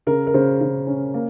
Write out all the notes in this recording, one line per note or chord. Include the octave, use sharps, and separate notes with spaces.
C#3 A#4
A#4
C#3 C5
C#3
C#4
A#3